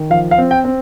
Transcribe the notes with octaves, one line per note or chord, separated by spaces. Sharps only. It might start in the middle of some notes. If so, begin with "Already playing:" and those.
Already playing: D#3
F3 F5
F5
C4
G5
C4